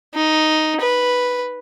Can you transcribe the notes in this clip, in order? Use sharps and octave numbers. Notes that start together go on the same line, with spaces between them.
D#4
B4